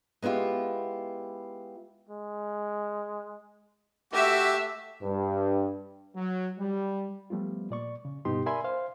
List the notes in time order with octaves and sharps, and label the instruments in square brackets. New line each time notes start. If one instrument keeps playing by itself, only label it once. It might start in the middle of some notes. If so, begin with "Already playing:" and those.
[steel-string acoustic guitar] G#3 B3 E4 F4 G4
[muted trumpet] G#3
[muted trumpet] A3 [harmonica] F#4 G4 [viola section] E5
[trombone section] G2
[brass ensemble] F#3
G3
[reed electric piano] F3 G3 A3 B3 F4
A#2 D5 C#6
C#3
G2 B2 B3 D#4 G4 C6
A#4 D5 E5 G#5 B5 C6
C5 F5 C6